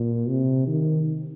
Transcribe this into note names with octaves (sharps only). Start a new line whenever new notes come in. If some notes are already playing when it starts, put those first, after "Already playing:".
Already playing: A#2
C3
D#3